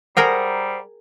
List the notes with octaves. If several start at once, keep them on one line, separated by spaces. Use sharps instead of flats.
G3 G#4 A#4 C5 F#5 G5 A#5 D#6